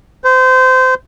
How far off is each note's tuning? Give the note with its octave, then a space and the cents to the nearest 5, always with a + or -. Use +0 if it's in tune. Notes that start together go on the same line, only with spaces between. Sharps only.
C5 -25